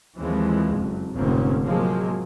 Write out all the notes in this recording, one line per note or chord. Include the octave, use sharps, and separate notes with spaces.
D#2 E3 F3 G#3 C4
F#1 F2
F1 G#2 D3 A#3 C4 C#4
A2 C3 F3 F#3 G#3 A#3